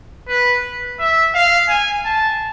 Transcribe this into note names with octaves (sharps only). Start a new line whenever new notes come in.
B4
E5
F5
G#5
A5